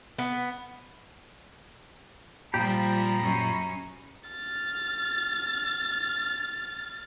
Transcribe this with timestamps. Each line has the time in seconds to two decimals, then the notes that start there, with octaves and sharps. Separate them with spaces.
0.18 B3
2.54 A#2 F3 G3 G4 A#5 B5
3.21 F#2 C#4
4.29 F6 A6